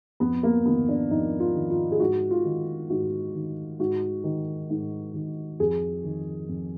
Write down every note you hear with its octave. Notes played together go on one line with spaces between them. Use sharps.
F2 B3
A#3
D#3 B3
D4
F2 D#4
F4
D#3
F4
G#4
G#2 F#4
F4
D#3
G#2 F#4
D#3
G#2 F#4
D#3
G#2
D#3
F2 G#4
D#3
F2